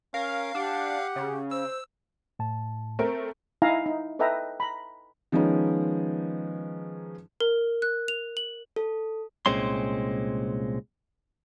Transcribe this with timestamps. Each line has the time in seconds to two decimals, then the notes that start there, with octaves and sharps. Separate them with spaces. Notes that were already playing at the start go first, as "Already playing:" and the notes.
0.14 C#4 A#4 F5
0.55 D4 G4 F#5
1.16 C#3
1.51 C5 E6
2.39 A2 A5
2.99 A3 C4 A#4
3.62 D#4 E4 E5 F5 G#5 A#5
3.86 D#4
4.19 A4 B4 D#5 E5 G5 A#5
4.60 A#5 B5
5.32 D#3 F3 G#3 B3 C#4 D#4
7.40 A#4
7.82 F#6
8.08 F7
8.37 F#7
8.76 A4
9.46 C2 A#2 G#3 C4 C#4 C6